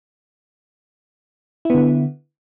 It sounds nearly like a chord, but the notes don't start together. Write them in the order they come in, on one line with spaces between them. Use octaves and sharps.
E4 B3 D3